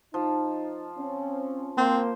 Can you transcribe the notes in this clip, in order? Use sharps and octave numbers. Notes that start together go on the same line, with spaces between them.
F3 D#4
C4 C#4
A#3 C4 C5